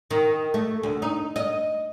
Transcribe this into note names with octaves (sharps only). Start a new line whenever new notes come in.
D#3
A3
D2
D#4
D#5